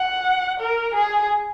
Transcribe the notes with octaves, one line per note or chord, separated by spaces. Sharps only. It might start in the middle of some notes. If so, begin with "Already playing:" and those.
Already playing: F#5
A#4
G#4